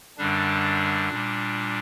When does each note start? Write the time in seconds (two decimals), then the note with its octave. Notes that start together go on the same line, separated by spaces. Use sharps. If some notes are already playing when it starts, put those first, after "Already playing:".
0.18 F#2 D3 G3 D4
1.10 A#2 G3